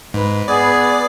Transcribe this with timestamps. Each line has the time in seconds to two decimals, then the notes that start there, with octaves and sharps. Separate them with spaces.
0.14 G#2 B4
0.48 B3 G#4 D5